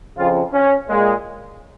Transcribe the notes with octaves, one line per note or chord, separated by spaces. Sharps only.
F2 C#3 F3 F4
C#4
A#2 G#3